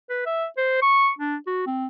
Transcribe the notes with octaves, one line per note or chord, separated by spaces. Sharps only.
B4
E5
C5
C#6
D4
F#4
C4